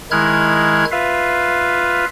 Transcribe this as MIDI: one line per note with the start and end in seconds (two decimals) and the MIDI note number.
0.11 0.85 51
0.11 0.85 56
0.11 0.85 64
0.11 0.85 89
0.11 0.85 90
0.11 0.85 92
0.92 2.05 65
0.92 2.05 71
0.92 2.05 76
0.92 2.05 77